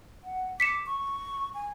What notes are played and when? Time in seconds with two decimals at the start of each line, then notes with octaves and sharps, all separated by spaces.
0.24 F#5
0.60 D6 B6 C#7 E7
0.86 C#6
1.54 G#5